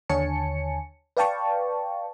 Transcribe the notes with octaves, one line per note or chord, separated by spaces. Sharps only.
D#2 D3 C#5 G#5 A5 C#7
B4 D5 F5 G5 A5 C#6